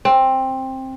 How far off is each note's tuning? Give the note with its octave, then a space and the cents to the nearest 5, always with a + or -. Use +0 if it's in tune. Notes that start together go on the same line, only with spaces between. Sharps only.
C4 +15